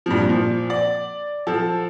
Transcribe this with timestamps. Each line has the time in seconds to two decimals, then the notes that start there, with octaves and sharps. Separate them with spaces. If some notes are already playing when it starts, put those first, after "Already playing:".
0.06 G2 A#2 F3
0.29 A#2 F3
0.70 D5
1.47 F3 A4